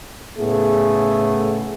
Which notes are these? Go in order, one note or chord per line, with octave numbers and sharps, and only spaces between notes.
A2 C#3 A3 B3 G#4